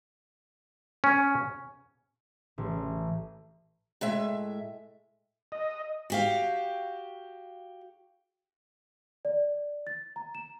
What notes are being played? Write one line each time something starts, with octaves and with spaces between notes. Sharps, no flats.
C#4
A1
A2 G#3 E5
D#5
F#4 G4 F5
D5
A6
A#5
E7